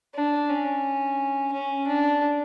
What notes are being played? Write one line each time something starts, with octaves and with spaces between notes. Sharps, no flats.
D4
C#4
C#4
D4